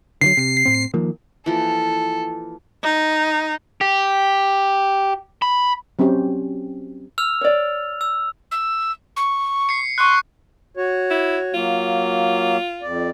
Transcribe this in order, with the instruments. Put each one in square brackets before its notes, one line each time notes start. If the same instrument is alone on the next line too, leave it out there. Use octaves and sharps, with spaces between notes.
[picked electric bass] D3 D#3 F#3 [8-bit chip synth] C7
[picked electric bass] C3
A2 C4
D#3 F3 A#3
[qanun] E3 F3 A#3 [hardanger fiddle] A4
[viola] D#4
[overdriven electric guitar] G4
B5
[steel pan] F#3 C4 C#4 G4
[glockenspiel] E6 F6 F7
[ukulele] C#5 D5
[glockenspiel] E6
[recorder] E6
C#6
[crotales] C7 C#7
[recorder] C6 [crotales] C#6 F#6
[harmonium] F#4 C#5
[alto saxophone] E4
[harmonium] F#3 A#3 [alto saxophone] F4
[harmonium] F2 D5